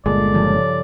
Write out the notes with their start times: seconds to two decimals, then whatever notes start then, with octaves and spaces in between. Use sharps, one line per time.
0.06 G1 A#2 G#3 A4 D5
0.34 G2 C#3 F3